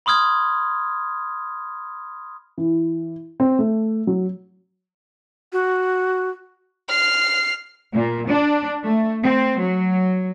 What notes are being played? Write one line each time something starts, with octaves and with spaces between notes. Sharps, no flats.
B5 C6 D#6 F6 G#6
E3
C4
A3
F#3
F#4
F6 C7
A#2
D4
A3
C4
F#3